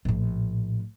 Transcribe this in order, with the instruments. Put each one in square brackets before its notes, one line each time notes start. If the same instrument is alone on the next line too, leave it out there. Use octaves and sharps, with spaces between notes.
[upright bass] A#1 A2